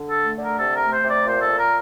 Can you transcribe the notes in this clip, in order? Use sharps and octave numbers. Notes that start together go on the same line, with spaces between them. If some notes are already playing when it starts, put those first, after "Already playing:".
Already playing: D3
A4
A3
D3
A#4
C3 A4
A#4
A3
C5
C3
D5
A#2 C5
A4
A#2
A#4